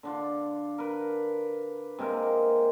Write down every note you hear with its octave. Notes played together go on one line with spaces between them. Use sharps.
D3 D4 F4
A#4 B4
C3 G#3 A#3 A#4